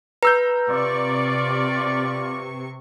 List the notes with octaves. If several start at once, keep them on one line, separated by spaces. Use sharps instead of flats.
B4 A#5 E6 G6
C3 F4 D5 C#6